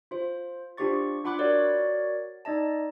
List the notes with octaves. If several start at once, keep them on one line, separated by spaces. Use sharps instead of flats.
F4 C5
D4 F4 G4 C5 C#6 A6
D4 F4 F#5 B5 D6 F#6
F#4 A#4 C#5 D5 F#5
D#4 D5 D#5 A5